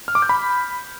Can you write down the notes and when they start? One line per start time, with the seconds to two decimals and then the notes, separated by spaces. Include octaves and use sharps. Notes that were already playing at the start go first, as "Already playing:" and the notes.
0.08 F6
0.15 D6
0.22 G6
0.29 B5